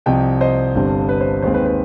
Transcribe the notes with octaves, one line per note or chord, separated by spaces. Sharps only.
C2 C3 F3 C4 D#5 G5
C5 D#5
G1 G2 D3 G3 C4
B4
C5
D#2 D#3 G#3 C4 C5
B4
B4